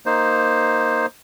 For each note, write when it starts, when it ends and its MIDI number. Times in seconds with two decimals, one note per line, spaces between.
0.06 1.06 58
0.06 1.06 63
0.06 1.06 72